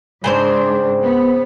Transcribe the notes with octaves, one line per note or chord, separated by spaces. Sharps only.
G#2 C#3 C4 D4 C5
B3